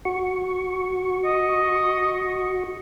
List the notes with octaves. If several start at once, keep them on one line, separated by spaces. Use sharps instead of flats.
F#4 C#6
D#5